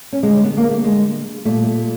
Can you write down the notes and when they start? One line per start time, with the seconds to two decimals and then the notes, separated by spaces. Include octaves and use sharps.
0.13 C#4
0.23 D3 G3 G#3
0.43 B3
0.57 A#3
0.71 A3
0.84 G#3
1.45 A#2 G3 A3